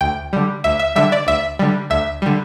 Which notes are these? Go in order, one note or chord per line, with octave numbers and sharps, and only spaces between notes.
D2 G5
D3 G3
D2 E5
E5
D3 G3 E5
D5
D2 E5
D3 G3
D2 E5
D3 G3